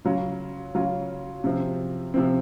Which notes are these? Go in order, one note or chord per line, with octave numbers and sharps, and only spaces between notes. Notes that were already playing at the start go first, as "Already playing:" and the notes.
C#3 F#3 C#4 F4
C#3 F#3 C#4 F4
C3 F3 C4
C3 F3 C4